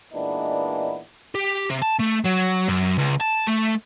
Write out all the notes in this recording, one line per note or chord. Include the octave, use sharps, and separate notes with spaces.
A#2 E3 G#3 B3 D4 D#4
G4
C3
A5
A3
F#3
F#2
C#2
A5
A3